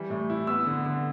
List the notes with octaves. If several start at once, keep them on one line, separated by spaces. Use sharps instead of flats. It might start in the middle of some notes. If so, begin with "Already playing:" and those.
Already playing: E3 G3
A2
E4
B3 E6
D3
D3